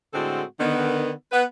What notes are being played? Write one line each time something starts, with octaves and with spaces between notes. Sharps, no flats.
A2 D3 G#3 C4 F#4 A4
D3 D#3 B3
B3 B4 F#5